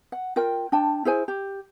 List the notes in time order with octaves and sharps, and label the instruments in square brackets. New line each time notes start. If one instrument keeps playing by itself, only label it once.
[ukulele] F#5
F4 A#4 G5
D4 G5 A5
E4 G#4 C5 G#5
G4